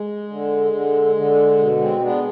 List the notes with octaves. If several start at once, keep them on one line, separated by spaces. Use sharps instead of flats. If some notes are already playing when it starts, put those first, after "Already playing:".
Already playing: G#3
D3
D3
D3
B2
G#3 C4
G#3 B3 D4